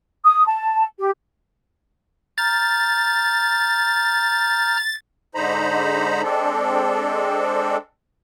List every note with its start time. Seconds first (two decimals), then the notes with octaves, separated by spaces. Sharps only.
0.25 D#6
0.46 A5
0.99 G4
2.38 A#5 F6 G6 A6
5.35 G#2 D3 D#4 C5 A#5 B5
6.22 G#3 C4 D4 A4